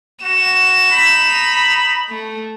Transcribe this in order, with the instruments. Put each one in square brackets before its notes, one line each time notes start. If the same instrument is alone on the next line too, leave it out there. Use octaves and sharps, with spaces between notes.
[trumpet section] F#4 [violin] E7
[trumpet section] D#4 B5
[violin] A3